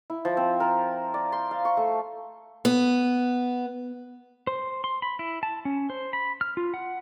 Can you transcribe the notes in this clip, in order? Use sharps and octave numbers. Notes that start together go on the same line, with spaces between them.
E4
F3
C4
A#4
D5
C6
F5
C#6
A3
B3
C5
C6
B5
E4
A5
C#4
C5
B5
F6
F4
F#5